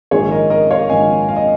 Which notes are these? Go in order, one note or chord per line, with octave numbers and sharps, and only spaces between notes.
A#1 G#2 D#3 G#4 C#5
A#4 D#5
A#4 D#5
C#5 F5
A#1 G#2 D#3 D#5 G#5
F5
D#5